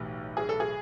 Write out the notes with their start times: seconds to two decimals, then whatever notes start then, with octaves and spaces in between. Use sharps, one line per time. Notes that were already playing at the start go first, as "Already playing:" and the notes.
Already playing: B1 A2 E3 G4
0.37 G#4
0.49 A4
0.60 G#4